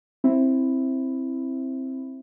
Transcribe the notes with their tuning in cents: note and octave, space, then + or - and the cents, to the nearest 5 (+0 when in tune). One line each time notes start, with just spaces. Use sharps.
C4 +10 E4 +0